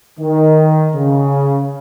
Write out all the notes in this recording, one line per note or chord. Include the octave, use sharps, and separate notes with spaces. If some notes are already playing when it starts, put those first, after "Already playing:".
D#3
C#3